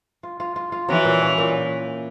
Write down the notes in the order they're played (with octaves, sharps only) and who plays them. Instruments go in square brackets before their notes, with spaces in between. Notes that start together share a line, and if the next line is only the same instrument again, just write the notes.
[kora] F4
F4
F4
F4
[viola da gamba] E3 [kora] F#3
[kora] A#2
C#4
A#2